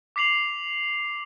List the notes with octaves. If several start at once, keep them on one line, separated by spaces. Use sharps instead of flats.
D6 B6 C7 F7 F#7